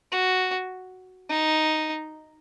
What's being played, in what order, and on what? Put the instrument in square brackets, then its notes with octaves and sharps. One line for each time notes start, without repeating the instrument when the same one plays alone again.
[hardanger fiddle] F#4
D#4